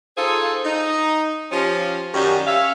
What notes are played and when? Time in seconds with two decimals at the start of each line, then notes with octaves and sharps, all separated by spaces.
0.17 D#4 F4 G#4 A4 C5 F5
0.65 D#4
1.52 F3 C#4 G4
2.14 F#2 D#3 G3
2.46 C#4 E5 F5